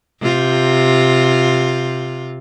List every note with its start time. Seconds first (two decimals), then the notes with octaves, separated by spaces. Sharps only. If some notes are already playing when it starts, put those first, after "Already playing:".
0.21 C3 F4